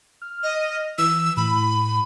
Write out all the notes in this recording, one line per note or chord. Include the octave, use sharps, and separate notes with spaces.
F6
D#5
E3 E6
A2 B5